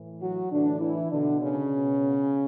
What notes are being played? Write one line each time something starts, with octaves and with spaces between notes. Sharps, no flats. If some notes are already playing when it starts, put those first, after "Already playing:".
Already playing: A2 E3
F#3 F#4
A2 D3 E3 D4
E3 E4
B2 D3 D4
C#3 C#4
B2